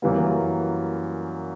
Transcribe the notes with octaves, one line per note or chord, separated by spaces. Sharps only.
F#2 E3 G3 A#3